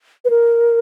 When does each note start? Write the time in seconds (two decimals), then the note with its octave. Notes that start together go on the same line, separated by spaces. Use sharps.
0.25 B4
0.30 A#4